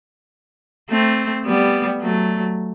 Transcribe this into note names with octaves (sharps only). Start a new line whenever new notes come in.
A3 C4
G3 B3
F#3 A3